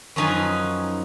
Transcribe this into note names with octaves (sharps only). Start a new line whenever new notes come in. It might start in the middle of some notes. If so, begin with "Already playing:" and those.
F#2 F3 C#4 D#4 B4 G#5